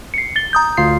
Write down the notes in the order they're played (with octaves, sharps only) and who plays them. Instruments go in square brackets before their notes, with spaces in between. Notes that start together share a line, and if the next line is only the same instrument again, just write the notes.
[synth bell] C7 C#7
A6 G7
A#5 D#6 G6
[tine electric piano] D2 F4 C7